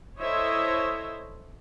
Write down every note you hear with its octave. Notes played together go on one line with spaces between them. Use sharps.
E4 A4 C5 C#5 D#5 E5